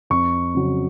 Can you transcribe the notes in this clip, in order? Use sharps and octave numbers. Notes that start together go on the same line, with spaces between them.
F2 C#6
C#3 F#3